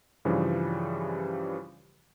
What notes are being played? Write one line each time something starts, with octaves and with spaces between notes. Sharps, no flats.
G2 C#3 E3 F3 G3